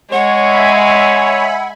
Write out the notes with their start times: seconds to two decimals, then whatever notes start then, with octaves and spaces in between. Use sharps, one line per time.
0.13 G#3 C#5 F#5
0.44 E5 G#5 B5